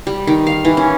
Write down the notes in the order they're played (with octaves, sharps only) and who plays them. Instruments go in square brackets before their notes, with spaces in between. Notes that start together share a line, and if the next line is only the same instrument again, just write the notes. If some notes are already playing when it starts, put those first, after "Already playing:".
[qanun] G3
D#3
F5
E3
C#4